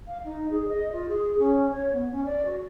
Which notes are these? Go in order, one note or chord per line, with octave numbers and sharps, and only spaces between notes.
F5
D#4
G#4
D#5
F4
G#4
C#4
C#5
B3
C#4
D5
F#4